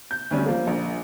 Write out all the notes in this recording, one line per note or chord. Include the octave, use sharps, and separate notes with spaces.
G6
D2 G3 C#4
F3 A#3
A#1